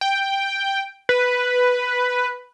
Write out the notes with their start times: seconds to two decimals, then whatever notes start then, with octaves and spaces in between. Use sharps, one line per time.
0.01 G5
1.09 B4